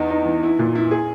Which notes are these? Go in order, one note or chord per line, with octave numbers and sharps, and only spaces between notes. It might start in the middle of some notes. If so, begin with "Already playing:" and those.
Already playing: E2 D#4
D#4
E3
E4
A#2
E4
G#4